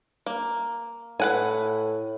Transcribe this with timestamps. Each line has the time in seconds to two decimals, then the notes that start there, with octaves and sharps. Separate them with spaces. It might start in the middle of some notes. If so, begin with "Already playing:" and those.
0.26 A#3
1.20 A2 B4 F#5 G#5